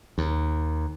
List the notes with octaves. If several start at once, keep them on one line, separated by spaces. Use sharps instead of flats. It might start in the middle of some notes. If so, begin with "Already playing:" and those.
D#2